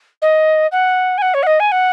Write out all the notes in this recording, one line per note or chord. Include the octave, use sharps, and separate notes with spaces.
D#5
F#5
G#5
F#5
C#5
F#5
D#5
G#5
F#5